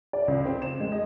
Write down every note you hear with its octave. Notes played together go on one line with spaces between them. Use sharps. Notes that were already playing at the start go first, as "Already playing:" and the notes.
D5
C#2
C4
E7
G#3
D#5